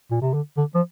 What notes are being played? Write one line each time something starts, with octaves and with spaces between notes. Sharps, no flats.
A#2
C3
D3
D3
F3